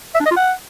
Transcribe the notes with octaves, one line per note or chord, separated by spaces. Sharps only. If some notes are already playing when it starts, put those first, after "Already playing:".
E5
D4
D#5
F4
F#5